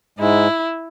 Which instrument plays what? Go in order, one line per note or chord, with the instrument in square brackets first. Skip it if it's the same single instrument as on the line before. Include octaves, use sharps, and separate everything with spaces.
[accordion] G#2 G#3 [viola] E4